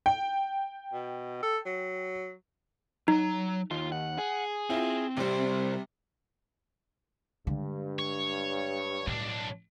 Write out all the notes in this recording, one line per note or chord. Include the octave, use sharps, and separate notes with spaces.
G5
B2
A4
F#3
F#3 D#4 A#5
D#2 F4
F#5
G#4
C4 E4 F4
C2 C3 G3 C5
G2 D3 G#3
C#5
B1 A2 D4